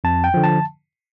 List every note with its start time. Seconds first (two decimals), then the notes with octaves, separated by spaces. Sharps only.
0.04 F2 A5
0.24 G5
0.34 D3 F3
0.44 A5